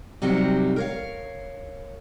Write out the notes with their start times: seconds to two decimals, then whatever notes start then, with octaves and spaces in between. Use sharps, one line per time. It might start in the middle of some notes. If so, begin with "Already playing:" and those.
0.22 C3 F#3 G3 D#4 F#4
0.76 A#4 C#5 F5